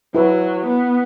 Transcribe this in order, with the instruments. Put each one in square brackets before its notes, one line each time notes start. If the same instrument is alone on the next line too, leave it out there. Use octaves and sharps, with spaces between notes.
[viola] F#3 [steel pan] E4 B4 E5
[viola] B3